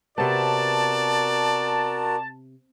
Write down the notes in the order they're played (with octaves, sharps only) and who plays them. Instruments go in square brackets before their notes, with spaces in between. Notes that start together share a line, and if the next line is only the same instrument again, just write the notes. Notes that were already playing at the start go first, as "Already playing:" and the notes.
[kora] C3 B3 [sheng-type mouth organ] F#4 A#4 [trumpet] D5 [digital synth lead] A5